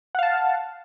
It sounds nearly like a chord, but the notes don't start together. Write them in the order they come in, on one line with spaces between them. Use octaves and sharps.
F#5 F5 A5